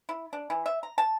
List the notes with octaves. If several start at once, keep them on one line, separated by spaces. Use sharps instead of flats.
E4
D4
E3
E5
A#5
A5